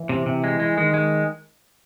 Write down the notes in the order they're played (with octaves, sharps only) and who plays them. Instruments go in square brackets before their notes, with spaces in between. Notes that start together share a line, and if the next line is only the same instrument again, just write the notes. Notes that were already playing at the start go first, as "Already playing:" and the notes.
Already playing: [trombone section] E3
[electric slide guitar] C3
C3
G#3
G#3
[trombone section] D#3 [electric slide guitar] G#3
[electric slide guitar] G#3